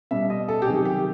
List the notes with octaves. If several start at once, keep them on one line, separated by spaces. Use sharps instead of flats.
B2 G3 E5
D#5
A4
G4
C3 D#3 F#3 G#4
G4